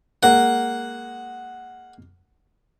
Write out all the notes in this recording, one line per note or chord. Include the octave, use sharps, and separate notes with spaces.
G#3 A#3 F#5